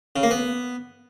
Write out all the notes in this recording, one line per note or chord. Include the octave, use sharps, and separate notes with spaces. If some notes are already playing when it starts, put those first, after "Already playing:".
C#3
A#3
B3